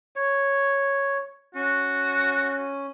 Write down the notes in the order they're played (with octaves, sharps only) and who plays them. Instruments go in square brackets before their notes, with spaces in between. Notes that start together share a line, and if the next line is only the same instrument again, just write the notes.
[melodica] C#5
[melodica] C#4 [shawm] F#4